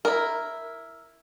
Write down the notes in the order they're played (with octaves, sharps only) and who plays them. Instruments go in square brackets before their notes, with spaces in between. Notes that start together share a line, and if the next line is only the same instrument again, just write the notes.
[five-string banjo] E4 A#4